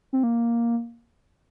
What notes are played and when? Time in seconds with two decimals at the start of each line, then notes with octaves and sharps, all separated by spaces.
0.13 C4
0.23 A#3